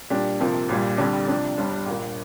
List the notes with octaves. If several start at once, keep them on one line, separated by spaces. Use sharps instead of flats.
A#2 G3 D4 G4
F2 C3 F3 A#3
A#1 A#2 G3
F1 F2 D3 G3 D4
C3 F3 D4
G1 G2 G3
A#1 A#2 A#3